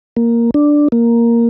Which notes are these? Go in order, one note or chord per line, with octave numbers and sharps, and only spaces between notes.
A#3
D4
A#3